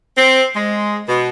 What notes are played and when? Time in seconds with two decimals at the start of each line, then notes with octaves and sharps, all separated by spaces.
0.17 C4
0.54 G#3
1.07 B2